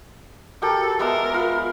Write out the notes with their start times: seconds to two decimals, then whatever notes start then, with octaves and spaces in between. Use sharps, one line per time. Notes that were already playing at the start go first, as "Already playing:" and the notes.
0.62 F#4 G4 A4 A#4
0.99 G#3 B3 A#4 E5
1.34 F4 B5